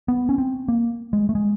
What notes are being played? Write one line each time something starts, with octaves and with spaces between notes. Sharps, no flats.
B3
C#4
C4
A#3
G#3
A3
G#3